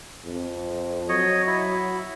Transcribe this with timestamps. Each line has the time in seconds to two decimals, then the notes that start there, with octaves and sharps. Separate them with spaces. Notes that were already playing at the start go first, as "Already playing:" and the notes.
0.25 F2
1.09 F#3 C#5 D#5
1.47 E4